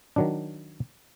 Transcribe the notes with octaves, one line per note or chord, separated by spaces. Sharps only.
D#3 F#3 D4